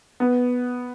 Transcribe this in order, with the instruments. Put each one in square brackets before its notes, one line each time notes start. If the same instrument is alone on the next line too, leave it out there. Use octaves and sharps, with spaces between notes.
[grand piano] B3